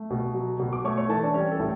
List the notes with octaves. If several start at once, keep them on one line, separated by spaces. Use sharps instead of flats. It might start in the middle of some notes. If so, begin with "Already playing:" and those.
Already playing: A3
B2
F#3
B2
D6
A3 C#5 C#6
C#5 C#6
E3 A4 A5
D4 D5
G3 C#4 C#5
A4
A2